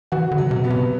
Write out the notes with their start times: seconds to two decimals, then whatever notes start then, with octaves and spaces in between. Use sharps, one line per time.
0.12 E3 F#4
0.31 D3
0.38 F#3
0.51 C3
0.64 B3
0.70 C3